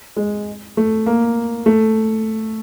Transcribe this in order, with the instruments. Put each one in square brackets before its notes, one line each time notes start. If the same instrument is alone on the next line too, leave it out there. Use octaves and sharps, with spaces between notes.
[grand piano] G#3
A3
A#3
A3